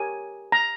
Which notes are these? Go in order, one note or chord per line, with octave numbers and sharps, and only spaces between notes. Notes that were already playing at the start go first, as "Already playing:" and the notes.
Already playing: G4 A#4 C#5 G#5
A#5